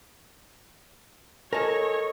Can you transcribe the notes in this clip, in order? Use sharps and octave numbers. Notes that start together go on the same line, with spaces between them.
A4 A#4 C#5 D#5 G#5 A5